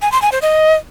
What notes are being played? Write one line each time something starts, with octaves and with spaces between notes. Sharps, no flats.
G#5
C6
G#5
C5
D#5